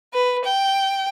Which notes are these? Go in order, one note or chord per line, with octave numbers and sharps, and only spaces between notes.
B4
G5